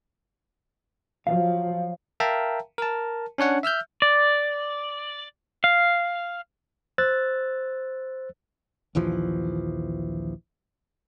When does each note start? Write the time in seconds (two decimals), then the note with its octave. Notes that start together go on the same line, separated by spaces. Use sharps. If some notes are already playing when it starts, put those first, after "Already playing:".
1.27 F3 F#3 F5
2.20 A#4 E5 F5 G5 A5 A#5
2.78 A#4 A5
3.38 C#4 D4 C#5 F#5
3.63 E5 E6 F6 G6
4.02 D5
5.64 F5
6.98 C5 E6 F#6 A6
8.95 A#1 D#2 E3 F3